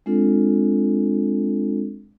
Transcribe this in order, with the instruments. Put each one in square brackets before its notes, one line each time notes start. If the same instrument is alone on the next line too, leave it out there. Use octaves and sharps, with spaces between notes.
[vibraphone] G#3 C4 D4 F4 A4